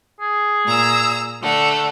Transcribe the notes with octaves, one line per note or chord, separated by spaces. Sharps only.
G#4
A#2 A#5 E6
D3 A3 F#5